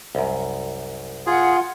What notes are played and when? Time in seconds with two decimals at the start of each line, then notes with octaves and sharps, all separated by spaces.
0.15 C2 F#2
1.27 F4 G#4 F#5